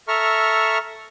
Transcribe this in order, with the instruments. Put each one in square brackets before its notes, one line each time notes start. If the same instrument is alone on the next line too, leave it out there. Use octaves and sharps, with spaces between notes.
[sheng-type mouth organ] A4 E5 A#5 C#6 F6